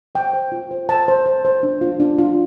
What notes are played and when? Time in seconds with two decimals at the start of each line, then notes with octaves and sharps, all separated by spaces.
0.15 C5 G5
0.33 C5
0.52 F4
0.71 C5
0.89 C5 A5
1.08 C5
1.26 C5
1.45 C5
1.63 D4
1.81 F4
2.00 D4
2.18 F4